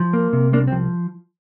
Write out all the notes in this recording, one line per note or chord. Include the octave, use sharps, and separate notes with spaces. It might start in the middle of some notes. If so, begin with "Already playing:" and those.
Already playing: F3
A#3
C3
C2 A#3 D4
C4
F3